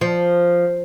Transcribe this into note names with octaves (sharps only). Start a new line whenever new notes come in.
F3